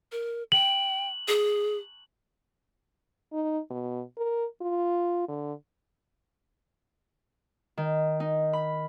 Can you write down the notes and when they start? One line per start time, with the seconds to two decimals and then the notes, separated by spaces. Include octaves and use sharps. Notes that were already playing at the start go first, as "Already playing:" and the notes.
0.12 A#4
0.52 G5 F#7
1.28 G#4
3.33 D#4
3.70 B2
4.17 A#4
4.61 F4
5.29 D3
7.77 D#3
8.20 D#4
8.53 B5